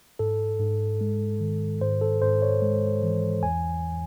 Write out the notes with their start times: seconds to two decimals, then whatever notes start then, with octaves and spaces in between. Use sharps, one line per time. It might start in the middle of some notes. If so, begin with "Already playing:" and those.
0.19 G#2 A4
0.60 G#2
1.01 G#3
1.41 D#3
1.81 G#2 C5
2.01 A4
2.22 G#2 C5
2.42 C#5
2.62 G#3
3.03 E3
3.43 E2 G#5